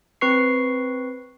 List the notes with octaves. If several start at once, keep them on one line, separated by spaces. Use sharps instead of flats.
C4 B4 C#6 C7